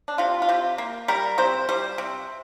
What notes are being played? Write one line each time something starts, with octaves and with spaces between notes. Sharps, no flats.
D4
C3 F4
F4
C3 G4
A#3
G3 A#4
C3 C5
G3 C5
C3